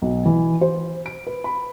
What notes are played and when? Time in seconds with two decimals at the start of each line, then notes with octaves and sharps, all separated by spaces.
0.02 B1
0.26 E3
0.61 C5
1.06 D7
1.27 B4
1.44 B5